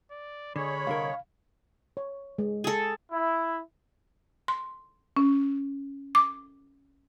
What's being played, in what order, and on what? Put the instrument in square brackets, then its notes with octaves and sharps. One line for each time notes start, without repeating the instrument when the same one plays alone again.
[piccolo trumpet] D5
[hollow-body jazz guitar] D3 [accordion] G#3 C#5 [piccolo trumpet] B5
[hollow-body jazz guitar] C2 D3 A#4 [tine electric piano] F5
[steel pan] C#5
G#3
[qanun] G#4 A4
[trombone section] E4
[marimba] C6
C#4
D6